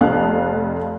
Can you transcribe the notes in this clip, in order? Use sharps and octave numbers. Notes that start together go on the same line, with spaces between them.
F1 F2 F3 F5 F#6